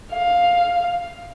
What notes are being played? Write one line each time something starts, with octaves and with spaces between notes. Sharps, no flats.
F5